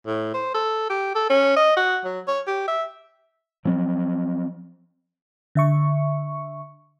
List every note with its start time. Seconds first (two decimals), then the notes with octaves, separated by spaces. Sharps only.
0.06 A2
0.34 C5
0.54 A4
0.90 G4
1.15 A4
1.30 C#4
1.56 D#5
1.77 F#4
2.05 F#3
2.28 C#5
2.47 G4
2.68 E5
3.65 F3 F#3 C4
5.55 D3 E5 C#6